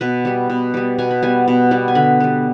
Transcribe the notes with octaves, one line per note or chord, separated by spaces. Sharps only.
B2 B4
G3 B3
B2
G3 B3
B2 G#5
B5
G3 B3 G#5
B2
G3 B3
G#5
D3 B5
G3 B3